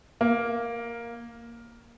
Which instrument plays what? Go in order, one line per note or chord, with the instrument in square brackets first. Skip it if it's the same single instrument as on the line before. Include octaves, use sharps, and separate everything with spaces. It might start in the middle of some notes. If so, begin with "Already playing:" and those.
[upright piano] A#3